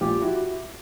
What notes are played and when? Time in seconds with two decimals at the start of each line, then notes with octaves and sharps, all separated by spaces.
0.01 A#1 F4 G4
0.22 E4 F#4